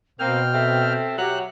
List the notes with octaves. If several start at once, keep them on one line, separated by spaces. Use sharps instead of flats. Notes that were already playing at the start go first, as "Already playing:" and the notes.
B2 A#3 C4 C5 G5 F6
C4 A4 E5
F#3 G4 F#5 F#6